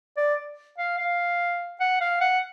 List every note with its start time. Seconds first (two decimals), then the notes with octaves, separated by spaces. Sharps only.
0.17 D5
0.78 F5
0.98 F5
1.80 F#5
2.01 F5
2.21 F#5